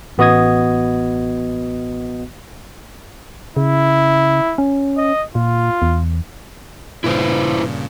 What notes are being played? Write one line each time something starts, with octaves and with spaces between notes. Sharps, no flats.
A1 B3 F#4 D#5 D#6 G#6
C#3 E4
C#4
D#5
A#2 F4
E2
G2 A#2 C#3 E4 B4 C5